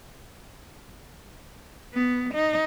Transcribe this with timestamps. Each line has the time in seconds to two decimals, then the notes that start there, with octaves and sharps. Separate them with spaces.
1.94 B3
2.34 D#4